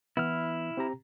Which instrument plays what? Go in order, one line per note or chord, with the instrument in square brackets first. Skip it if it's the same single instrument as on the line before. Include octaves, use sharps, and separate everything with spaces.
[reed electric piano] E3 B3 [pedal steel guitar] E4 F6
[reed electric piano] C4 G4 A#5